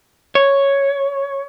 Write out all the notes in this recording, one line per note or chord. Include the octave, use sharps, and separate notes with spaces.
C#5